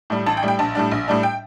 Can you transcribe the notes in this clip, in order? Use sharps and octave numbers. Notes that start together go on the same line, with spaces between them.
A2 G3
A1 A5
G5
A2 G3
G5
A#1 A5
A2 G3 D4
A#1
A2 G3 D4
G5